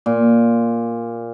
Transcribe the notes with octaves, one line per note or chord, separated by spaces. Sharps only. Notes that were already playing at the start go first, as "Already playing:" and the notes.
A#2